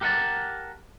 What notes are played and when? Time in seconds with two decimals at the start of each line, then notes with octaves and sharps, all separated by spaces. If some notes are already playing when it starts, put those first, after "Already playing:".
0.01 G4 A#4 F#5 G5 A5